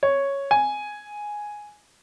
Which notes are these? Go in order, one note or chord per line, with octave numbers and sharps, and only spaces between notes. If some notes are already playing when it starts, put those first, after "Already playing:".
C#5
G#5